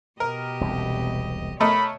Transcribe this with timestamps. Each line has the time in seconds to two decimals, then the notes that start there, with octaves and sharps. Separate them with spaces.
0.20 B2 G4 A#4 D#5
0.61 E1 C2 F2
1.61 A3 A#4 C#5 D#5 B5